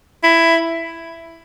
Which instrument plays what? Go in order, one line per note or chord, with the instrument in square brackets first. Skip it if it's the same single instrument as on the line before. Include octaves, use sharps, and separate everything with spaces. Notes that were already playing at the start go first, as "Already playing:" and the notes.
[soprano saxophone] E4